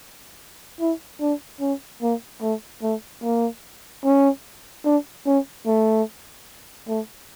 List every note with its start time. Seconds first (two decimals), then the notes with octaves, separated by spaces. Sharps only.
0.80 E4
1.21 D4
1.61 C#4
2.02 A#3
2.42 A3
2.83 A3
3.23 A#3
4.05 C#4
4.85 D4
5.26 C#4
5.66 A3
6.88 A3